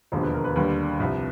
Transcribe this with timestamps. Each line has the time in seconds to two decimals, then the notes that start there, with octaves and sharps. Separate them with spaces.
0.12 E1 D#2 D3 F3 C5
0.23 B4
0.34 A#4
0.44 B4
0.56 D#2 D3 G3 B4
1.00 C2 C3 F3